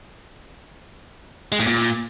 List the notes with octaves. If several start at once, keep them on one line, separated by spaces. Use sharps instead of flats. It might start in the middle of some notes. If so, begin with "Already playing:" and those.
G#3
A2
A#2